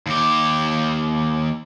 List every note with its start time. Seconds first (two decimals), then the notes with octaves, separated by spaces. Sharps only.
0.06 D#2 G4